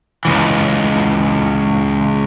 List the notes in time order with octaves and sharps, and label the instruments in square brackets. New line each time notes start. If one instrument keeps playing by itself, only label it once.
[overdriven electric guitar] C#2 E3